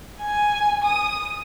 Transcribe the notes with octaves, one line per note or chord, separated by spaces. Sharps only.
G#5
D#6